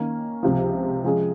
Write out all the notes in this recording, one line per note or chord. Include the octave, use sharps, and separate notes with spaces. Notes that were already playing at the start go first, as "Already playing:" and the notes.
Already playing: D#3 A#3 C#4
C#2 C3 F3
F3 G#3 C#4 G#4